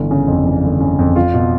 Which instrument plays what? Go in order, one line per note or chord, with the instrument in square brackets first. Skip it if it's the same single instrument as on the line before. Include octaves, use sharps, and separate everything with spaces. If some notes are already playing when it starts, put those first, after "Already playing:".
Already playing: [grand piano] G1 E3
C#3
F2
E3
G1
C#3
F2
F4
B2